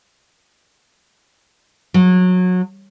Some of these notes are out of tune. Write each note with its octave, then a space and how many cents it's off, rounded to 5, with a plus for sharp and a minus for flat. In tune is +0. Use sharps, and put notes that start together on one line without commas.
F#3 -25